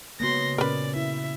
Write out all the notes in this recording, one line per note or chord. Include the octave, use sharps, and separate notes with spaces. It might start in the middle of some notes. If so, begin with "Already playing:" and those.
C#3 G#3 A#3 B3 F#4 C6 A#6
A#2 C#4 A#4 B4 D5
E4 E5